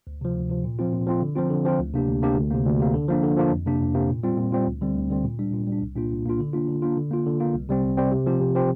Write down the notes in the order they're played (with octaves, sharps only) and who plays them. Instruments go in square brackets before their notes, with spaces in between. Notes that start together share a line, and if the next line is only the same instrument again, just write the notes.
[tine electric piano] D2
C3 F3
D2
C3 F3
A#2
F3 C4 F4
A#2
F3 C4 F4
D3
F3 C4 F4
D3
F3 C4 F4
D2
C3 A#3 D4 G4
D2
C3 A#3 D4 G4
D2
C3 A#3
D2
C3 A#3
D3
F3 A#3 D4
D3
F3 A#3 D4
F2
C3 A#3 D4
F2
C3 A#3 D4
A#2
G3 C4 F4
A#2
G3 C4 F4
D2
D3 G3 C4
D2
D3 G3 C4
A#2
G3 D4
A#2
G3 D4
C2
A#2 A#3 D4 F4
C2
A#2 A#3 D4 F4
D3
A#3 D4 F4
D3
A#3 D4 F4
D3
A#3 F4
D3
A#3 F4
C2
C3 G3 C4
C2
C3 G3 C4
C3
F3 C4 G4
C3
F3 C4 G4